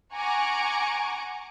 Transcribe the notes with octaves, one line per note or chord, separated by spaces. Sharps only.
F#5 G#5 A#5 C#6 D6